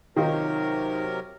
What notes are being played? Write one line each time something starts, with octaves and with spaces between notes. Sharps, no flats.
C3 D#3 F#3 D#4 F4 A#4